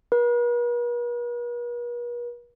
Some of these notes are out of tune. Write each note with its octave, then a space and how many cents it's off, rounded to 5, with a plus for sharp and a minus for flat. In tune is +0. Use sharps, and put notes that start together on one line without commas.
B4 -45